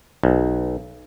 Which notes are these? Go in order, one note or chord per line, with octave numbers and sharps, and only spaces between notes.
B1